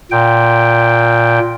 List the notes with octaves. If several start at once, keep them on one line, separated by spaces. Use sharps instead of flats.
A#2 G5